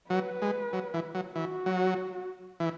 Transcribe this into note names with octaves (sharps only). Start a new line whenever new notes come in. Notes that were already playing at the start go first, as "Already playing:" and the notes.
F#3 B4
G#3
F#3
E3
F#3
E3 F#4
F#3
E3